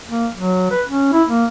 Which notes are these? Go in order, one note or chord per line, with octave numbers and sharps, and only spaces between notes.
A#3
F#3
B4
C#4
E4
A#3